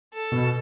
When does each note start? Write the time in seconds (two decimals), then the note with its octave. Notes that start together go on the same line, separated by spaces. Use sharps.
0.14 A4
0.32 B2